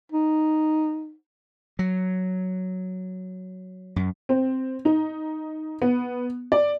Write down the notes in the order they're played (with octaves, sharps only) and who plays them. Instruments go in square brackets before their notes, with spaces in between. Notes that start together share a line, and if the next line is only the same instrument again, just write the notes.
[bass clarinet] D#4
[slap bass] F#3
F#2
[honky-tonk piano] C4
D#4
B3
D5